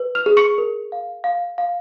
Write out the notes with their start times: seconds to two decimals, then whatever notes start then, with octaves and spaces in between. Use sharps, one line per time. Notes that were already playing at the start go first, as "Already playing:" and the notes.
Already playing: B4
0.15 F6 F7
0.26 G#4
0.37 C#6 C#7
0.58 A#4
0.92 F5
1.24 F5
1.58 F5